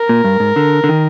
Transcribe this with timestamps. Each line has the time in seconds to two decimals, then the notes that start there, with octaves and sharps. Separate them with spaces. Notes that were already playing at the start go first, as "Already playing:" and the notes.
Already playing: A#4
0.09 A#2
0.24 G2
0.40 G#2
0.56 D3
0.84 D3
0.89 D#3